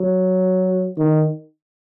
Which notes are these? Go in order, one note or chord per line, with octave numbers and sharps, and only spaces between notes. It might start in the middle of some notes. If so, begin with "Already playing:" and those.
Already playing: F#3
D#3